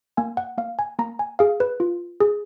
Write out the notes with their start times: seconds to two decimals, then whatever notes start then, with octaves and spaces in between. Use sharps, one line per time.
0.17 A#3 G#5
0.37 F#5
0.58 A#3 F5
0.79 G#5
0.99 A#3 A#5
1.19 G#5
1.39 G#4 F5
1.60 B4
1.80 F4
2.20 G#4